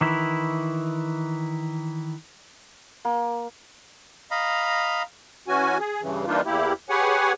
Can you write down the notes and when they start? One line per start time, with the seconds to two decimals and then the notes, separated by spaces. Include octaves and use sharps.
0.01 D#3 E3 E4
3.05 A#3
4.31 D#5 F5 A#5 B5
5.48 E3 C#4 F#4 G#5
5.80 G#4
6.02 G2 C#3 E3
6.27 E3 G3 A#3 D4 D#4 F4
6.46 E2 A#3 E4 G4
6.90 G4 G#4 B4 C#5 F#5 G#5